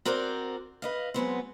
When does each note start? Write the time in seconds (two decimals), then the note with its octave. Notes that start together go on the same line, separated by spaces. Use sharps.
0.05 C4 F#4 A#4 C5 D5
0.82 B4 D#5 F5
1.14 F#3 G#3 B3 C4